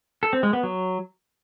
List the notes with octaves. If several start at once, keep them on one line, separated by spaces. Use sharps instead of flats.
A4
C4
G#3
B3
F#3